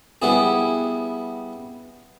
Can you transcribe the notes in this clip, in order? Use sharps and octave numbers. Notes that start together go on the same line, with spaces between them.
G3 B3 E4 G#4